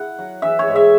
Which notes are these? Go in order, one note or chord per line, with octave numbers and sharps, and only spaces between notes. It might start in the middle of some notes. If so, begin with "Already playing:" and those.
Already playing: E4 F#5
F#3
E3 E5
C#5
G#2
E5